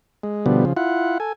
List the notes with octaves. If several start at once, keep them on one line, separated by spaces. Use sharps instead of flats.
G#3
B2 D3 F3 G3 B3
C#3 F3
E4 F4 F#5
A4 G#5